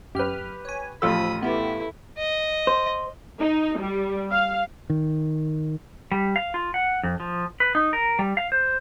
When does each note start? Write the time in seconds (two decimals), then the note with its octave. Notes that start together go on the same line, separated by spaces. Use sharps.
0.15 F#2 G4 B4 F6
0.65 C#5 G#5
1.02 A1 F3 F4 A4 B5 D#6 E6
1.42 A3 B3 E4 G4
2.18 D#5
2.67 C5
3.39 D#4
3.79 G3
4.31 F5
4.90 D#3
6.12 G3
6.36 F5
6.54 F4
6.74 F#5
7.03 F2
7.20 F3
7.60 B4
7.75 D#4
7.93 A#4
8.19 G3
8.37 F5
8.52 C5